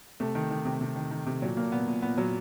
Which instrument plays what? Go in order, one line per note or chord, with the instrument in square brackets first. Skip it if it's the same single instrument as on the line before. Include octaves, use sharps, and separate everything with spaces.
[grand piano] C3 A3
D#3
D#3
C3
C3
D#3
D#3
C3
A#2 F#3
A#2 A#3
A#2 B3
A#2
A#2 B3
A#2 F#3